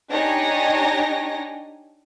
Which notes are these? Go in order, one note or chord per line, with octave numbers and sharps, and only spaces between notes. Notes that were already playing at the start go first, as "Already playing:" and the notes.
D4 D#4 G4 C#5 G#5 A#6